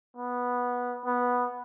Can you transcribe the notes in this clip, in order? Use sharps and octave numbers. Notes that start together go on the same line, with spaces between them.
B3
B3